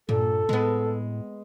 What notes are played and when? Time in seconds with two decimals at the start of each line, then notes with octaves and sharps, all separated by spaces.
0.09 G2 A#2 A4
0.49 A2 G#3 B3